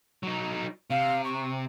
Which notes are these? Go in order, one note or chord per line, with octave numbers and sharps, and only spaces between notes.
F#3 D#4
C3 F5
C#6